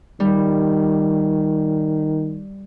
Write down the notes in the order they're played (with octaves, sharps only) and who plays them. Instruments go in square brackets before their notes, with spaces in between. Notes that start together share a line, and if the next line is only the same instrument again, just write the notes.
[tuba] D#3 [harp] G3